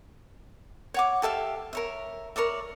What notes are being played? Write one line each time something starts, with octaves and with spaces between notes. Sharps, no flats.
C#5 F#5 D6
G4 A4 E5 F5
A#4 C#5 E5
A#4 C#5 D5 E5